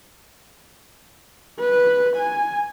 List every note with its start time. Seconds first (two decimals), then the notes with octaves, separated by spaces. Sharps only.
1.59 B4
2.17 G#5